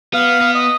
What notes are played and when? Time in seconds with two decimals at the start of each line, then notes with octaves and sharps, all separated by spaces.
0.13 B3 F5
0.41 B3
0.55 D#5